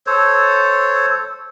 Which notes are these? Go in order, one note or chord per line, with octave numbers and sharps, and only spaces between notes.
A4 C5 C#5